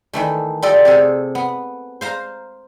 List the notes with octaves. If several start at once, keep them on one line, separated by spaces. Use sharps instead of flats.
D#3 E3 A3
G3 F4 A4 D5 D#5
C3 G#4 A4
B3
C5 F5 A#5